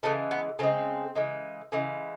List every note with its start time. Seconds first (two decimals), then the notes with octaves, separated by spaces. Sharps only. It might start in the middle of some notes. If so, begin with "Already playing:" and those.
0.03 C#3 E3 G#3 A3
0.31 B3
0.59 C#3 E3 G#3 C4
1.15 C#3 E3 G#3
1.72 C#3 E3 G#3